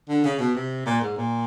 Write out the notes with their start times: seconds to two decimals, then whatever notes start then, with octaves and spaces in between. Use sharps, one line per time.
0.09 D3
0.24 C#3
0.39 B2
0.55 C3
0.86 A#2
1.01 G#2
1.17 A#2